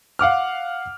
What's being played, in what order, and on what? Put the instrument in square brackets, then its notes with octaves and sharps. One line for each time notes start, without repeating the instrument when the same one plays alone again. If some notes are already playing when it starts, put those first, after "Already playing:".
[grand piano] F5 F#5 D6 F6